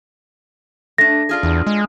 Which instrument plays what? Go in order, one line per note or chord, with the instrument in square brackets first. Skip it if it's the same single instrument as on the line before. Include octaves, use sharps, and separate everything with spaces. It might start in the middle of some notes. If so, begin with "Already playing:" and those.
[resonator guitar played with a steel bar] A3 D4 [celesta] A#6
[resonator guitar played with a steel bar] D4 F4 G#4
[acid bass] E2
G#3